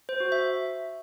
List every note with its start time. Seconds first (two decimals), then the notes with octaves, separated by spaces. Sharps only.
0.09 C5
0.20 F#4
0.32 E5